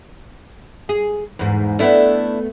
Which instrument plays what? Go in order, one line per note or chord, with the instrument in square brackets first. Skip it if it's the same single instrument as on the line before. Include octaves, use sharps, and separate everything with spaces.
[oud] G#4
E2 G#2
[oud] A3 B3 [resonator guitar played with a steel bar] D4 E4